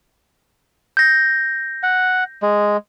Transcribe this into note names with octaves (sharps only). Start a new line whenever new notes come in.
G6 A#6
F#5
G#3